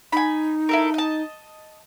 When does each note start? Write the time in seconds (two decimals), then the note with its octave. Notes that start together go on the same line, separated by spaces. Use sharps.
0.12 D#4 G#5 B5
0.69 E4 A4 A#4
0.94 D#5 A5